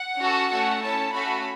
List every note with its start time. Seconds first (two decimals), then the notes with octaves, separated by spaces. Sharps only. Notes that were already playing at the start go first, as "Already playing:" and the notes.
Already playing: F#5
0.19 C#4 F#4 A4
0.51 A3 C#4 F#4 A4
0.82 C#4 E4 A4 A5
1.13 A3 C#4 F#4 A4 B5